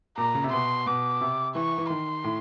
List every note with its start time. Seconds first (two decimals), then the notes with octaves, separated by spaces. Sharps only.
0.18 A#2 A#5
0.35 C#3
0.44 C3
0.53 B2 C6
0.86 B2 D6
1.21 C3
1.55 E3 C#6
1.78 E3
1.90 D#3 C6
2.24 A2